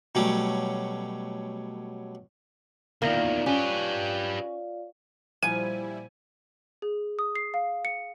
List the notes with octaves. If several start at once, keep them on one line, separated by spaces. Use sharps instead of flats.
B2 F#3 G3 A3 C#4 D6
E2 D#3 A#3 F4 D5 F5
C#4 G4 B4
A#2 F3 G3 E4 G#5 D#7
G#4
D#6
C7
F5
C#7